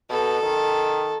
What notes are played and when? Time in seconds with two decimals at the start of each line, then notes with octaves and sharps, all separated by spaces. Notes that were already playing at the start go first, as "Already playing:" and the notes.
0.10 B2 A4
0.43 D#3